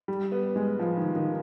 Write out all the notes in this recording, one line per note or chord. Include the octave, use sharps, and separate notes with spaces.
G3
B3
G#3
F3
D#3
D#3